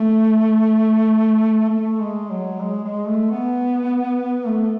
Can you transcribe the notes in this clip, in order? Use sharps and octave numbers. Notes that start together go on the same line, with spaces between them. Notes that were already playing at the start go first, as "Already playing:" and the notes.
Already playing: A3
A3
G#3
F#3
G#3
G#3
A3
B3
A3